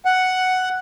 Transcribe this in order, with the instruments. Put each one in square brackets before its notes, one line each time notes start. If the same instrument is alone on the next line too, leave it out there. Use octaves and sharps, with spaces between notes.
[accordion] F#5